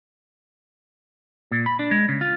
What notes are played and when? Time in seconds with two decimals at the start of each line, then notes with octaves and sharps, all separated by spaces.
1.51 A#2
1.66 B5
1.79 D4
1.91 G#3
2.09 C#3
2.21 F4